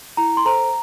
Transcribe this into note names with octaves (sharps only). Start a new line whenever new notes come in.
E4 A#5
C6
A4 C5 A#5